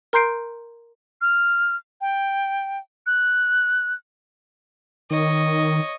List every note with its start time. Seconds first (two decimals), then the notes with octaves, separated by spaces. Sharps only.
0.13 A#4 A#5 C6 G6 C7 D7
1.21 F6
2.01 G5
3.07 F#6
5.11 D#3 C#5 D#5